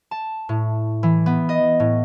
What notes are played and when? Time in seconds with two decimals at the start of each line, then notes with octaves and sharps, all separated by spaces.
0.11 A5
0.49 A2
1.03 E3
1.26 B3
1.49 D#5
1.80 A2